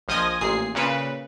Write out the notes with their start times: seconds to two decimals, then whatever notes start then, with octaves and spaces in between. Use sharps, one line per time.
0.08 A#1 F3 D#5 G#5 D#6
0.41 A1 A#2 G#4 C7
0.75 A#2 C#3 B4